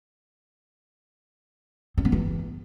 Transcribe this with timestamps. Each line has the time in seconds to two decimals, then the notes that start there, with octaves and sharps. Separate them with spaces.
1.98 C4
2.05 B3
2.12 E3